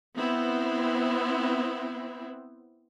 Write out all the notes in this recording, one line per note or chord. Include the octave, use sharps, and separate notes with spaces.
B3 C4 E4